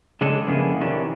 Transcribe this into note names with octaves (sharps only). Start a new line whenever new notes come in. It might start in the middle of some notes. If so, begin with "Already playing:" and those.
C#3 G#3 D4 G#4 A4
F2 C#3 A#3 B3 E4 G#4
C3 D#3 E3 C#4 D4